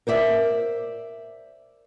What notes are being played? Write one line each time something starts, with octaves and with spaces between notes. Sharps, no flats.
A#4 C5 D5 E5